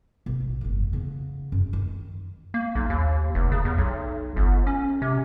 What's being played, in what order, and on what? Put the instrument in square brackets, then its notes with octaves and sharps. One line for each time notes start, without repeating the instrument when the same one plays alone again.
[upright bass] B1
A#1
G1 F2
C#3 B3
F#2
D#3
[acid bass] A#3
B1
D#2
F1
C#3
E2
B1
G1
C#4
C3